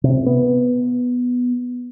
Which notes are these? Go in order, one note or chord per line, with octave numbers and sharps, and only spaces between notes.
C3
B3